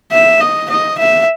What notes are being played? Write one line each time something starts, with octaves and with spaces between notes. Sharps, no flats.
E5
D#5
D#5
E5